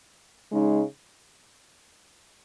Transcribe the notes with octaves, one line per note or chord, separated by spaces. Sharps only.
C#3 G#3 D#4